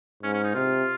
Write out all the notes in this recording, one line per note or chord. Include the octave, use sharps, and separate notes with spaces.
G#2 C#4
C#4
D#4
C3 F4